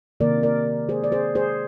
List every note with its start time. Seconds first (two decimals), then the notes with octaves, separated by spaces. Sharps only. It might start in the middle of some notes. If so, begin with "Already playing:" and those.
0.20 C3 D#3 A#3 A#4 D5
0.43 A#4 D5
0.89 G#4 C5
1.04 D5
1.12 G#4 C5
1.35 G#4 C5